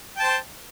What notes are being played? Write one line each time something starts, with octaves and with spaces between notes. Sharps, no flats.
C5 G5 A5